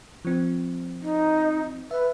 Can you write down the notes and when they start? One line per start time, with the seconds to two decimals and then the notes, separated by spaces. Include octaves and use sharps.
0.25 F3 C4
1.02 D#4
1.91 B4 E5